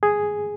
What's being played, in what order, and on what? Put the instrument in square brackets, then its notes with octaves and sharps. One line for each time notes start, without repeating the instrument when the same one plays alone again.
[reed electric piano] G#4